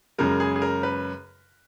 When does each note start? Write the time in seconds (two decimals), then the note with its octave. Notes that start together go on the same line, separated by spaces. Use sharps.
0.18 F#2 C#3 G#3 A#4
0.40 G#4
0.56 G#4
0.62 A#4
0.83 B4